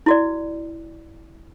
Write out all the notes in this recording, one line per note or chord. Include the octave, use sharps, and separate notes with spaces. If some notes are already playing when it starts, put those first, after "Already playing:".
E4 F#4 D5